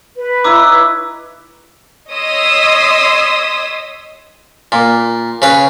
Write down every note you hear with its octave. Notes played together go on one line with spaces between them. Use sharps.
B4
D#4 E4 C#5 D6 E6
C#5 D#5 C6 D#6 E6 B6
A#2
C#3 B4